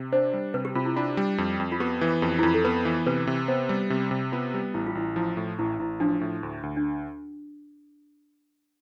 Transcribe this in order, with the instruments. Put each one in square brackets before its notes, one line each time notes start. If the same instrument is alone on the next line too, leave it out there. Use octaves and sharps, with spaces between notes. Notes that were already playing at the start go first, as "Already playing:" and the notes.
Already playing: [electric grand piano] C3
[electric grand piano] D4 [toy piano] C5
[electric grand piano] G3
[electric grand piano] C3 [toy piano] B4
[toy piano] G4
[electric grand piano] C3 [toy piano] F4
[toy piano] E4
[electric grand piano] D4 [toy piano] F4
[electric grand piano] G3
F2
F2
[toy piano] F4
[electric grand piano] B3 [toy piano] G4
[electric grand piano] E3
[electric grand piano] F2 [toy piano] G4
[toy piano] G4
E4
[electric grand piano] F2 [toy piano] F4
[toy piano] A4
[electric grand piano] B3 [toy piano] B4
[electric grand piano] E3
[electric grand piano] C3 [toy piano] B4
[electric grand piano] C3
[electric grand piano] B3 [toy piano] C5
[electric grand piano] G3
C3
C3
[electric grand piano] B3 [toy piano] F4
[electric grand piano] G3
[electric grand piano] A1 [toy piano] E4
[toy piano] F4
[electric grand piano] A1 [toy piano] E4
[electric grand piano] F3 [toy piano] E4
[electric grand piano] A2
[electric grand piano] A1 [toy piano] E4
[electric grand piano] A1 [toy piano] E4
[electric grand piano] F3 [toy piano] D4
[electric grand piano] A2
D2
D2
[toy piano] D4